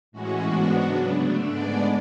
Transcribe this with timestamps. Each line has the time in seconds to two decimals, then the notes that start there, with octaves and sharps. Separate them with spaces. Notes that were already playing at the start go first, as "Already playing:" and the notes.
0.12 A2 E3 G#3 C#4 F#4
0.45 G#2 G#3 B3 D4
0.79 C#3 F#3 B3 D4
1.13 D3 A3 D4
1.46 G#2 G#3 B3 D4 D5